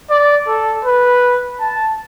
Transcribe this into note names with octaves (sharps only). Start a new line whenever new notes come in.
D5
A4
B4
A5